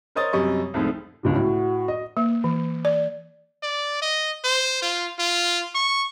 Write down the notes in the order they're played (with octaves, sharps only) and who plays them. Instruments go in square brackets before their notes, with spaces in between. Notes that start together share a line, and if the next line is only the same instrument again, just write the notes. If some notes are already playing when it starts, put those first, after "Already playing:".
[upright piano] A#4 C5 C#5 D#5 D#6 A6
F#2 C3 G3 D#5 C#6
C2 F2 G#2 A3
C#2 B2 D3
[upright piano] A2 [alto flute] F#4
[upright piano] D#5
[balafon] A#3
E3
D5
[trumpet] D5
D#5
C5
F4
F4
C#6